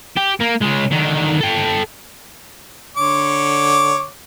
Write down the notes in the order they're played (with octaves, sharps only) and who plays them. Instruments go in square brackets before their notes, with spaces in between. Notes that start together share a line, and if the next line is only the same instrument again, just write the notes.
[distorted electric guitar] G4
A#3
C#3 G#3
D3 D#3
A4 G5
[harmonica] D3 C#5 D6